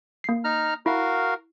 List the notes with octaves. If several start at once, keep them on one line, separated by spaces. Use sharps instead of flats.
A#3 C7
D#4 A#5 F6
E4 F#4 A#4 F5